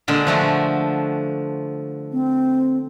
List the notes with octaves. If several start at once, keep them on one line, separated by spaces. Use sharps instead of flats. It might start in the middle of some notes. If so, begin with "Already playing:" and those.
A#2 D3 G#3
F3 A3 F#4
C4